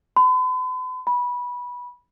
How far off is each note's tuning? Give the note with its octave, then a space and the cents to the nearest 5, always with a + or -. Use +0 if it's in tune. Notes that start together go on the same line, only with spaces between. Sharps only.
B5 +45
B5 -15